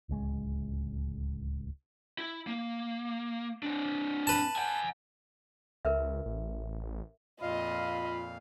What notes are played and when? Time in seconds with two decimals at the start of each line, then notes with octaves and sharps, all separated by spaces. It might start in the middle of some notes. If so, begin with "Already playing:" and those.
0.09 D1 C#2 G#3
2.19 E4
2.47 A#3
3.63 C4 D4
4.27 B4 A5
4.56 F#5 G#5
5.85 C#2 A#4 B4 E5
6.26 A1
7.42 F2 A#2 F4 D#5 F5 B5